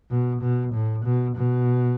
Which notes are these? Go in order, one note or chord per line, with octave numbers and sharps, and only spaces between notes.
B2
B2
A2
B2
B2